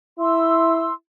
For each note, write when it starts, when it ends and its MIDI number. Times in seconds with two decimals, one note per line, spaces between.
0.19 0.91 64
0.19 0.91 84
0.19 0.91 88